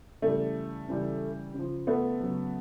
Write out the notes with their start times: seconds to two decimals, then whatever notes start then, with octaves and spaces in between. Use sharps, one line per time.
0.22 C#3 E3 G3 A3
0.88 C#3 E3 G3
1.54 C#3 F3
1.87 A3 B3
2.20 C#3 F#3